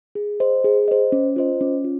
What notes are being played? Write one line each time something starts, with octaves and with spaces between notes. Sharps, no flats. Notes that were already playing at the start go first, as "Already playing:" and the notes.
G#4
C5 D#5
G#4
C5 D#5
C#4
F4 C5 D#5
C#4
F4